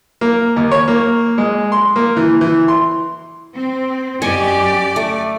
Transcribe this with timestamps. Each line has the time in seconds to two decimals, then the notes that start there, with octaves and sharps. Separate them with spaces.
0.21 A#3
0.56 D#2
0.71 C#5
0.88 A#3
1.38 G#3
1.72 C6
1.96 A#3
2.17 E3
2.41 E3
2.68 C6
3.55 C4
4.22 F#2 G4 D5 D#5 G#5 C#6
4.96 A3